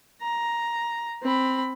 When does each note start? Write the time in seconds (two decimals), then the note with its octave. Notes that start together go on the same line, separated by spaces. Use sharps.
0.22 A#5
1.22 C4 B5